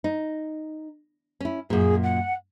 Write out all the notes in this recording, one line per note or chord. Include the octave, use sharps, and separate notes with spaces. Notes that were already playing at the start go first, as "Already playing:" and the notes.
D#4
C#4 E4
F#2 A#2 G#4
F#5